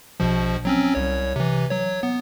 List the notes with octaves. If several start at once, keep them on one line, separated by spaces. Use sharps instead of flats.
A#1 B2 F3
F#3 C4 C#4
C2 C#5
C3 E3
F#3 C#5
B3